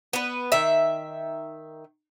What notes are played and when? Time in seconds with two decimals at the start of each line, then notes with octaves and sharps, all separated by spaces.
0.13 B3 B4
0.52 D#3 E5